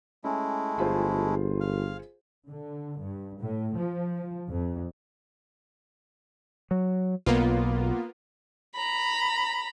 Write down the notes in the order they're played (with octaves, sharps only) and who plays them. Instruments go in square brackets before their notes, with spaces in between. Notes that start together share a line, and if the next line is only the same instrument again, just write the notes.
[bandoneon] G#3 A3 E4 [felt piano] C#4
[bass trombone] G1 [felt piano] F4 G#4 C5
[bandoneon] F5
[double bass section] D3
G2
A2
F3
F2
[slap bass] F#3
[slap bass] B1 [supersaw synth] A#3 B3 F4
[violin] A#5 B5